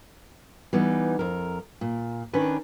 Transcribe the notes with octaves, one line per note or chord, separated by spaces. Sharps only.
E3 G3 B3 D#4
F2 A#4
A#2
D#3 C#4 D4 B4